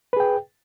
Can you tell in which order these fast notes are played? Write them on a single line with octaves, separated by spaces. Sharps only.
B4 G#4 G5